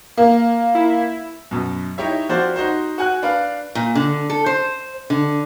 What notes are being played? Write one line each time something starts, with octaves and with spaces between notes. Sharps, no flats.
A#3
E4
F#2 B2
D#4 E4 G4 C#5 E5
F3 C4 F#4 C5 D5
D#4 F#4 C5
F#4 F#5 G#5 F#6
D4 B4 F5
A#2
D3
A4
C5
D3